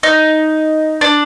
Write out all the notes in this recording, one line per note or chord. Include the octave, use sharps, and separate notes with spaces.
D#4
D4